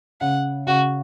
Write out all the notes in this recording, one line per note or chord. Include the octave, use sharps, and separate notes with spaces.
C#3 F#5
C#3 F#4